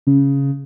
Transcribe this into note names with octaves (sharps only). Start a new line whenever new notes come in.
C#3